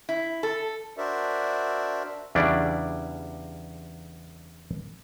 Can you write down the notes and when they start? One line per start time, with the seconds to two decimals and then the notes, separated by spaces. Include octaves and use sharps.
0.09 E4
0.43 A4
0.98 D4 F#4 A#4 C5 D5 E5
2.35 E2 C#3 G3 D4 E4 D5